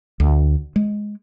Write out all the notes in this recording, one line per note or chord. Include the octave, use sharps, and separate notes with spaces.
D2
G#3